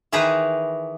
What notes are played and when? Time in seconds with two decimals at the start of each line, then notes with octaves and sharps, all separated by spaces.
0.12 D#3 E3 D#4 G#4 B4 A#5